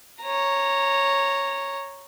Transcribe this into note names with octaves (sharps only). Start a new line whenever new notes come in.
C#5 A#5